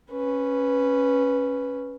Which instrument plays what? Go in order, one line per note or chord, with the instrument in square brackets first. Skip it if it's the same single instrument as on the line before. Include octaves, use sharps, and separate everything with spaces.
[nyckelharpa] C#4 B4